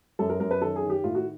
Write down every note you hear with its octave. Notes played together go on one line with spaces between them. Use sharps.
F#2 A4
A#4
F#2 A#4
B4
D#3 A4
G#4
D#3
G4
A2 F4
F#4